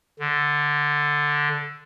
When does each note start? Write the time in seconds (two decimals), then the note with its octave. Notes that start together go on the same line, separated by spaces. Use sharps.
0.19 D3